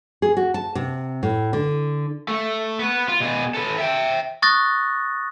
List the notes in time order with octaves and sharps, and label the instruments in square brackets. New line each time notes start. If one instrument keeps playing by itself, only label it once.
[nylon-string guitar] G#4
F#4
A5
C3
A2
D3
[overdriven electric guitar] A3
B3 B4
F4
B2 G#4
A4 B4
E5 G5
[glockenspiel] C#6 D#6 F#6 A6 A#6